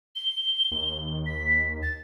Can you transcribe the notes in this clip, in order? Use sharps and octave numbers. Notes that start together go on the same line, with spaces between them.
G7
D#2
B6
A6